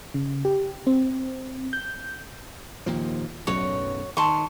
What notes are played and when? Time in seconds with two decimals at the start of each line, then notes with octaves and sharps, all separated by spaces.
0.14 C#3
0.45 G4
0.87 C4
1.73 G6
2.86 D#2 A#2 F3
3.47 B1 F#2 A2 F#4 C#5
4.17 D#3 A5 C6 C#6